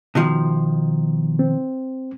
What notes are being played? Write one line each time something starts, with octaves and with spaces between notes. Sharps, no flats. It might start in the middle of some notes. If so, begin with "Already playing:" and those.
B2 D#3 F3
C4